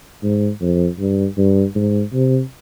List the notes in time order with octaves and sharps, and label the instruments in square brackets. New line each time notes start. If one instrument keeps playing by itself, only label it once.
[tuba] G#2
F2
G2
G2
G#2
C3